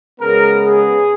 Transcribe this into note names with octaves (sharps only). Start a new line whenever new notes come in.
C#3 G#3 B3 A#4
G#4